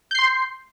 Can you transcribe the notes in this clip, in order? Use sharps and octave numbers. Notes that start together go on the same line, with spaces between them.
C6 G6 C7